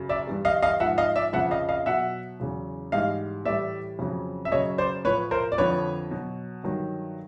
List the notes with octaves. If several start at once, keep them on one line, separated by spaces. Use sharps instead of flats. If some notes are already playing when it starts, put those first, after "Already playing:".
Already playing: F#2 C#3 F#3
D5 E5
G2 E3 G3
D#5 F5
D#5 F5
G#2 F3 E5 F#5
D#5 F5
D5 E5
F2 C#3 F3 E5 F#5
D#5 F5
D#5 F5
B2 F#3 E5 F#5
E2 C#3 F#3
G#2 E3 G3 D#5 F5
A2 E3 G3 D5 E5
F2 C#3 F#3
E5
F#2 C#3 F#3 C#5 D#5
C5 D5
A2 F3 B4 C#5
A#4 C5
D5
F2 D3 F3 B4 C#5
B2 F#3
G2 D#3 F#3